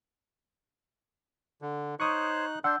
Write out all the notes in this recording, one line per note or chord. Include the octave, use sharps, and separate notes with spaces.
D3
D#4 C5 C#5 C#6 D#6 F#6
D4 F#5 C6 E6 G6